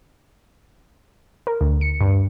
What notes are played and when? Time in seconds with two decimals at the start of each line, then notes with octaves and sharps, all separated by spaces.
1.47 A#4
1.61 D2
1.81 C#7
2.01 G2